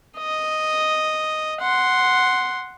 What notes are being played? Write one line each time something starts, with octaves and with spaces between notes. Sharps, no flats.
D#5
F#5 C6